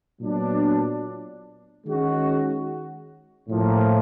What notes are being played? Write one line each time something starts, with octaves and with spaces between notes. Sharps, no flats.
A#2 F#3 B3 D4
D#3 G#3 C#4 F#4
A2 F3 A#3